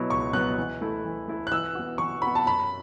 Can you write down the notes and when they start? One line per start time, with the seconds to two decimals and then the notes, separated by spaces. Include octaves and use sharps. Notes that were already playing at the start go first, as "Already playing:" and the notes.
Already playing: B2 F#3 B3 E4
0.09 C#2 C#6
0.33 B2 F#3 B3 E4 F#6
0.57 E3
0.81 A3 E4 A4
1.05 E3
1.28 A3 E4 A4
1.47 F#6
1.52 E3 E6
1.75 B3 F#4
1.98 E3 C#6
2.22 B3 F#4 B5
2.35 A5
2.46 F#2 B5